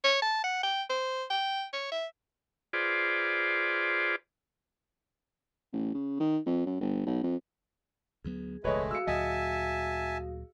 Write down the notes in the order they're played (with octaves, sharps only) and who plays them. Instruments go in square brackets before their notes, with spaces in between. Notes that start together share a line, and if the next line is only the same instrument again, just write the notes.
[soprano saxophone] C#5
A5
F#5
G5
C5
G5
C#5
E5
[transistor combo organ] F4 G#4 B4 C5 D5
[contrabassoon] A1
C#3
D#3
F2
F#2
G1
B1
F2
[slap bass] D2 F#3 B3 [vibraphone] G#4
[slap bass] E1 C#2 [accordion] G#3 A3 [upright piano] B4 C#5 D#5
[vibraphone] F#4 G#4 F5 [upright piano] E6 C#7
[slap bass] D2 A#2 F#3 [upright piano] D#5 [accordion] E5 G#5 A5